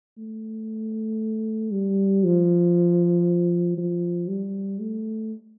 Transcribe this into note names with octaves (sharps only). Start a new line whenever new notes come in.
A3
G3
F3
F3
G3
A3